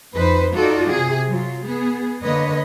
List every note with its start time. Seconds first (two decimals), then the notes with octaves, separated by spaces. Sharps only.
0.13 F2 D#4 B4 C5
0.54 D#4 F4 F#4 A4 D5
0.89 C3 G#4
1.28 F#3 F4
1.64 B3 G#4
2.21 D3 A#3 B4 C#5 D#5